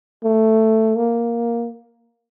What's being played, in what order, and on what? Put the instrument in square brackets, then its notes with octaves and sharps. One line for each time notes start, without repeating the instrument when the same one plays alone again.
[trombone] A3
A#3